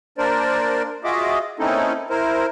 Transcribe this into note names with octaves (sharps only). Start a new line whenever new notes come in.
A#3 D4 A#4 C5 D5
F4 F#4 G#4 D#5 E5 D6
A#3 C4 C#4 D#4 E4 A4
E4 A#4 C5